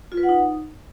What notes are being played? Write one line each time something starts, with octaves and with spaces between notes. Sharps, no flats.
F4
B4
F#5
D#4